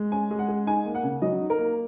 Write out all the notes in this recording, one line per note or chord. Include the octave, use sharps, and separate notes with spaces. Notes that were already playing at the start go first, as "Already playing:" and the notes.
Already playing: G#3
C#4 G#5
G#3
F#5
G#4
D#4 G#5
A#3
F#5
C#3
F#3 D#5
D#4
A#4
A#3